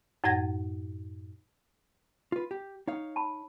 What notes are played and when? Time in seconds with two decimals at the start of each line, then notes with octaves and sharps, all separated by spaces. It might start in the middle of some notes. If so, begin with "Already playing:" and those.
0.24 F#2 A2 F#5 G#6 A#6
2.32 F4 B4
2.51 G4
2.88 D#4 C#5 F5
3.16 A5 B5